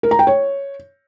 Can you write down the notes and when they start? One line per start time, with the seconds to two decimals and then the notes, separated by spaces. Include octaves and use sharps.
0.03 A#4
0.11 A#5
0.19 G5
0.27 C#5